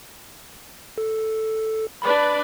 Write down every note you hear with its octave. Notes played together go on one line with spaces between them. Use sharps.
A4
D4 B4 D5 B5